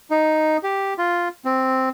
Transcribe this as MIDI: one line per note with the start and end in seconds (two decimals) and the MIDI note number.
0.11 0.57 63
0.63 0.94 67
0.98 1.28 65
1.45 1.89 60